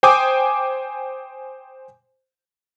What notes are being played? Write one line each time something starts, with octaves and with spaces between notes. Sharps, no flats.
C5 G5 G#5 D6 D#6